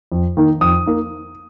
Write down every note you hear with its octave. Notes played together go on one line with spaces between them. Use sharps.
F2
D#3 A#3 D#4
F2 D#6
A#3 D#4